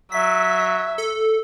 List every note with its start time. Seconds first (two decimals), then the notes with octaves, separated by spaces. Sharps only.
0.12 F#3 E5 B6
0.98 A4